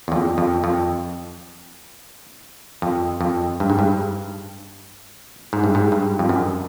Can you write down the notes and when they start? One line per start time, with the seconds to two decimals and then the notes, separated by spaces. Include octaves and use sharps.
0.08 E2
0.12 F2
0.38 F2
0.64 F2
2.82 F2
3.21 F2
3.60 G2
3.70 G#2
3.79 G2
5.53 G#2
5.64 G2
5.75 G#2
5.92 G2
6.19 F2
6.29 F#2